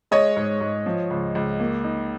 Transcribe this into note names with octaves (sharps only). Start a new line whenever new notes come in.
G#3 C#5 D#5
G#2
G#2
F3
C#2
C#2
A#3
D#4